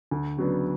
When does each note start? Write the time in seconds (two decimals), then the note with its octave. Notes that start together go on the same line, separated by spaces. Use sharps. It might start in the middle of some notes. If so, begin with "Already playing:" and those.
0.11 D2
0.37 C#3 F#3 B3 D4